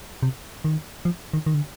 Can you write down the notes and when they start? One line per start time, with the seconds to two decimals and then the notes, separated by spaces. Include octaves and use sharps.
0.23 C3
0.65 D#3
1.05 F3
1.34 D#3
1.46 D#3
1.54 D3